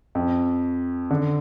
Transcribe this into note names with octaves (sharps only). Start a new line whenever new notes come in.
F2
D3